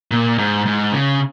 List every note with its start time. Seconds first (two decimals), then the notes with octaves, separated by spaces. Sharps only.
0.11 A#2
0.38 G#2
0.66 G#2
0.92 C#3